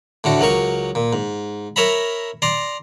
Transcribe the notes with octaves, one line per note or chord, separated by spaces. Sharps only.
A2 D3 F#4
C#2 F#3 A#4 C#6
A#2
G#2
A#4 C#5 E5 A#5 B5
D5 A#5 C6